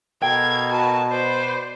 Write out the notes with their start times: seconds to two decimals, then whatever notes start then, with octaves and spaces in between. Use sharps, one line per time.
0.22 B2 A4 A#4 F5 G5 G#6
0.72 F#4 A#4 B4 A5
1.11 B4 C5 D5